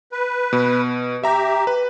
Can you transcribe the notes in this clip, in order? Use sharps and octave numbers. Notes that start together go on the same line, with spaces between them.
B4
B2
G4 E5 A#5
B4